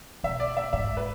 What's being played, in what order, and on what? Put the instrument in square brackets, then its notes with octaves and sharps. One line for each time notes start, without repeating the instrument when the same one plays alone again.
[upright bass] B2 [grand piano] E5
[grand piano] D5
E5
[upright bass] G#2 [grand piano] E5
[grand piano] B4